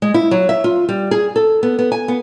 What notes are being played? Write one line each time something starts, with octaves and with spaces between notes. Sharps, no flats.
G#3
E4
F#3
E5
F4
G3
G#4
A4
B3
B3
G#5
B3